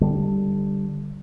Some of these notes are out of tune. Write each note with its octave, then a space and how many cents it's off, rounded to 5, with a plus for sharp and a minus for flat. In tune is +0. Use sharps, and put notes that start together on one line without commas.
D3 +0 G3 +0